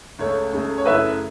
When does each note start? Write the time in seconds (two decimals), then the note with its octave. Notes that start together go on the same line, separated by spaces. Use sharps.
0.19 C#2 C#3 A3 C#5
0.53 C#2 C#3 A3
0.78 C#5
0.86 F#2 C#3 A3 E4 B4 E5